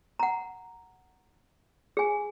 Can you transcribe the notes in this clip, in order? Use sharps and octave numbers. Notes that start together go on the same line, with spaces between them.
F#5 A#5
G#4 G#5